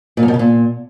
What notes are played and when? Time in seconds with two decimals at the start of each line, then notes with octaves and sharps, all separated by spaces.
0.17 A#2
0.23 F#2
0.28 B2
0.34 C#3
0.39 A#2